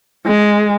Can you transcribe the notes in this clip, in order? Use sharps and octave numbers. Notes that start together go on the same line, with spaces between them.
G#3